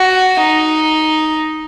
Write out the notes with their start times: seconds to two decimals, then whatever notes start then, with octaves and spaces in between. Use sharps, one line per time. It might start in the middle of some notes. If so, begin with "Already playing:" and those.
Already playing: F#4
0.41 D#4